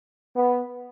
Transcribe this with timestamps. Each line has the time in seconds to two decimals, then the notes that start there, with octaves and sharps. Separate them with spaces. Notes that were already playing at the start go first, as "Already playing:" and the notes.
0.36 B3